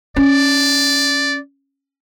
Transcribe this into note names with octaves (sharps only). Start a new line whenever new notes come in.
C#4 D5